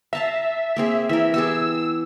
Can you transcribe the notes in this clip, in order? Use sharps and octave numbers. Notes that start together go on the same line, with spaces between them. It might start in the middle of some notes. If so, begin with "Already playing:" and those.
E5 F5 A5 A#5
A#3 C4 G#4
E3 A#4 E5
B3 G4 G#4 E6